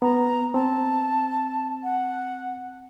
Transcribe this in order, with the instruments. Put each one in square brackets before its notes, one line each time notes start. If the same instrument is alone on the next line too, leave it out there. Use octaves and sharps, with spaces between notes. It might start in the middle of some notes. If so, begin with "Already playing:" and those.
[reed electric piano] B3 [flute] A#5
[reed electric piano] C4 [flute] A5
[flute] F#5